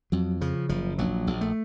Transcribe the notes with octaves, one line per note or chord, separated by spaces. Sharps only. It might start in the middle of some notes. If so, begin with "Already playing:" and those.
F2 F#3
C#3 F3
F#1 F3
A#1 F#3
A#1
A3